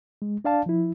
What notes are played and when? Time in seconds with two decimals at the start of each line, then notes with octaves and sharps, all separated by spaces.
0.22 G#3
0.45 D4 D5 F5 A5
0.66 F3 E4